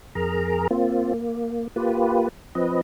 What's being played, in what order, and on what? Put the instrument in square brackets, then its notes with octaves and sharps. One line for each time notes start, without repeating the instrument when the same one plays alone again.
[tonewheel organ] F2 G#4 A#4 A#5
A#3 C4 F4
A#3
A#3 F4 G4 B4
F3 C4 B4 D#5